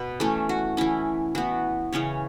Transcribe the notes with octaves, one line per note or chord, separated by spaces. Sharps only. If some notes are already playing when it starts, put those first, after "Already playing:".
Already playing: B2 B3 B4
E3 A3 C#4 A4
F#4
E3 C#4 E4
E3 B3 F#4
C#3 E3 C#4 C#5